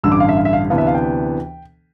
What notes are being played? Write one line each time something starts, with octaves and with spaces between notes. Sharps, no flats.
A1 G2 D3 G3 E6
D6
F5
E5
F5
E5
F5
D2 C3 E3 B3 D4 F5
E5
F5
G5